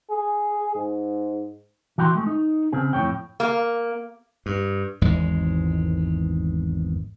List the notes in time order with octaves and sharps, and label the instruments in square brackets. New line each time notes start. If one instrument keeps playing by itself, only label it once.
[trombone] G#4
G#2
[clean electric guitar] E3 F#4 G5 A#5 C6
G#3 A3
D#4
C#3 C4 G#4
F2 A2 D#3 C#5 G5
[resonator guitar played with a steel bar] A#3
[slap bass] G2
G#1 E2 G#2 G#3